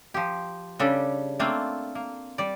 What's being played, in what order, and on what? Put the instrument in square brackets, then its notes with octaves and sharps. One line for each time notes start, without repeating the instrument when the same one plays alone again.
[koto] F3 G4
C#3 G3 D4 A4
A3 A#3 C4 D4 F4
A#3
G3 D5